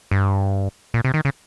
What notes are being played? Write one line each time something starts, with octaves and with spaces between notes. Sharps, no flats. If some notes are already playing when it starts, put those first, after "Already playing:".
G2
A#2
C3
D#3
C#3